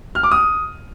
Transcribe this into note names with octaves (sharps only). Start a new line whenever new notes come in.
F6
D6
D#6